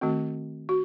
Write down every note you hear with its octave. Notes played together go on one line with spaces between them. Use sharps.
D#3 A3 C4 F#4
F#4